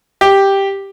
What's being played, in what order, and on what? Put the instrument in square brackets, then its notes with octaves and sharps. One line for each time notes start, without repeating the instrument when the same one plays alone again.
[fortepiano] G4